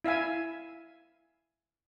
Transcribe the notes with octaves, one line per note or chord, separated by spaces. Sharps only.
E4 E5 F5 G#5